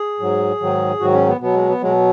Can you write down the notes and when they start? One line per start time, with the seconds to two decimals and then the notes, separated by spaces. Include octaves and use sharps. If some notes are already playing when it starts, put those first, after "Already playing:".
Already playing: G#4
0.20 G#2 F#3
0.60 G#2 D#3 F#3
1.00 G#2 D#3 F#3 F#4
1.14 C#4
1.28 B3
1.40 B2 F#3 B3
1.54 G#3
1.68 B3
1.81 B2 F#3 G#3